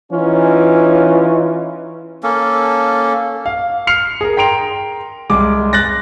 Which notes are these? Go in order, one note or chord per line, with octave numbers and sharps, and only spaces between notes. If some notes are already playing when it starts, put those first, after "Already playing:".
E3 C#4 D#4 F4
A#3 C#4 A4
F5
F6 C7 C#7 F7
G#4 A#4
G5 A#5 C6 D7 F7
C2 G#3 D6
F#6 A6 A#6